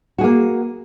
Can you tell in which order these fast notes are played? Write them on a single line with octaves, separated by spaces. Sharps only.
F#4 G#4 A#3